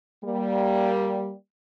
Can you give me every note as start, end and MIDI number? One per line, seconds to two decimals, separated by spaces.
0.23 1.33 55
0.23 1.33 58